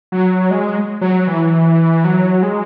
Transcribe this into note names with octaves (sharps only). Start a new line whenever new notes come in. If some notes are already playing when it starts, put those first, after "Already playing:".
F#3
G#3
F#3
E3
F#3
G#3